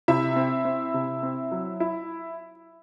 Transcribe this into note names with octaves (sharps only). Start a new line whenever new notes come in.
C3 E4 E5
C4
C4
C3
C4
F#3
E4